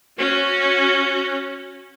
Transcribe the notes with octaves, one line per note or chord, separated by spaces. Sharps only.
C#4 F#4